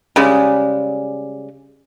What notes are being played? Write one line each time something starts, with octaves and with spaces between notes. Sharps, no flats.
C#3 G3 G#3